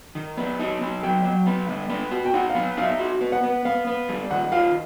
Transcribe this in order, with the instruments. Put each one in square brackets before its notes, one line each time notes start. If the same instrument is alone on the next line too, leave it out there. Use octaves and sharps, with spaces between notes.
[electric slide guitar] D#3
B3
D#4
B3
[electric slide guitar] F#3 [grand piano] G5
[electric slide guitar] F#3
B3
G3
B3
F#4
[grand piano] G5
[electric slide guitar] D#4 [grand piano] F#5
[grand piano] F5
[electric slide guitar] B3
[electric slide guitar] D#4 [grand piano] F5
[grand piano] E5
[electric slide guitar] F#4
B3
[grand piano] F#5
[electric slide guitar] B3
[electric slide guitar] B3 [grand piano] F5
[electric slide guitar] B3
G3
[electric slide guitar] D#3 [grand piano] F#5
[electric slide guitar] F4 [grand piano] F5